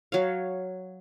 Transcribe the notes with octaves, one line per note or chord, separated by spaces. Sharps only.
F#3 C#5 F5